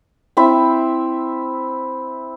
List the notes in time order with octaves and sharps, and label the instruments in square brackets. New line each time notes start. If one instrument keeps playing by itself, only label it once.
[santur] C4 E4 E5